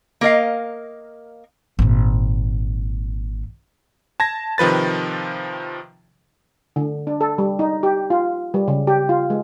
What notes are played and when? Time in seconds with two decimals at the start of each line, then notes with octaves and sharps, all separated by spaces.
0.21 A#3 A#4 D#5 F5
1.79 G#1 A#2
4.20 A5 G#6 A#6
4.58 C3 D#3 F3 B4 A6
6.76 D3
7.07 D4
7.21 A4
7.38 G3
7.59 D#4
7.83 G4
8.10 F4
8.54 G3
8.68 C#3
8.87 G4
9.09 F4
9.30 G#3